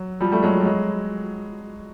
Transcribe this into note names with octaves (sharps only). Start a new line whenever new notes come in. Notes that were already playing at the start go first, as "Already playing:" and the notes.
Already playing: F#3
F3 G3
G3 A3
F#3 G#3
G3
F#3 G#3